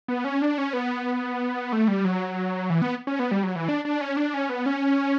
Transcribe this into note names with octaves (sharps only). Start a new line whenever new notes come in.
B3
C#4
D4
C#4
B3
A3
G3
F#3
E3
B3
C#4
B3
G3
F#3
E3
D4
D4
C#4
D4
C#4
B3
C#4